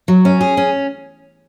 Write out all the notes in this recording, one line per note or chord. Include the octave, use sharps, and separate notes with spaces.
F#3
C#4
G#4
C#4